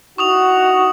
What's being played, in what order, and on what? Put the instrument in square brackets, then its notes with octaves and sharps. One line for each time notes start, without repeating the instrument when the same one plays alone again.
[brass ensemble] D#4 E4 F#4 [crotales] C#6 D#6 F7